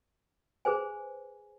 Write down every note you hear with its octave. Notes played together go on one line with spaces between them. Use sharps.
G#4 B4 C5 G#5